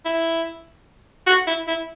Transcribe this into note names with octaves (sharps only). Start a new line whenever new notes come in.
E4
F#4
E4
E4